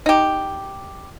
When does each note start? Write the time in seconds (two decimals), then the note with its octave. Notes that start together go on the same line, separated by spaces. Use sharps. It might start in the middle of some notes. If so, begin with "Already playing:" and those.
0.06 D#4 G4